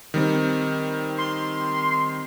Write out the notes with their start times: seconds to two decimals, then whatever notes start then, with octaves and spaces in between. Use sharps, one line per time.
0.14 D#3 G3 C4
1.18 C6